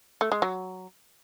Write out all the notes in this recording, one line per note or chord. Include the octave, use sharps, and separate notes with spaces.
A3
G#3
F#3